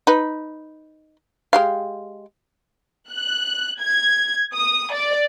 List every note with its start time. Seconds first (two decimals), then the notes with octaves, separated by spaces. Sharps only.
0.07 D#4 B4
1.53 G#3 G4 F5
3.11 F#6
3.80 G#6
4.54 D#6
4.93 D5